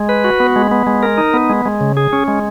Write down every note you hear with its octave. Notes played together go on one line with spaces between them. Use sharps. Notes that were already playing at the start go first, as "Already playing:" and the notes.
Already playing: G#3
B4
F#4
B3
G#3
B3
G#3
A#4
D#4
B3
G#3
G#3
C#3
G#4
C#4
G#3